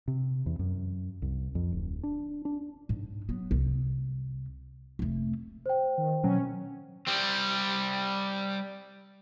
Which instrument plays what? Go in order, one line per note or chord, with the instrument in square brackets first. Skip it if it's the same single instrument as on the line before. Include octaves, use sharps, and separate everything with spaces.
[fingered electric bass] C3
E2
F#2
C2
F2
D1
D4
D4
[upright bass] G#2
F#3 B3
C2
F1 A3
[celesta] C5 G5
[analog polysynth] D#3
[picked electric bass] B2 F#3 [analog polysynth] C#4
[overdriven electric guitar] G3 C4